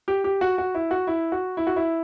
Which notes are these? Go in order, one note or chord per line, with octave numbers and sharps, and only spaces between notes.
G4
G4
F#4
F#4
E4
F#4
E4
F#4
E4
F#4
E4